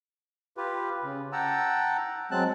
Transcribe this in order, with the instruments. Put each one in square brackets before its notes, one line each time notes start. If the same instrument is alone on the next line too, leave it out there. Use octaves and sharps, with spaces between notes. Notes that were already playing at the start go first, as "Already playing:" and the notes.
[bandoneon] F4 G4 B4
C#3
F#5 G5 A5 A#5 E6
F#3 G#3 C4 A5 F#6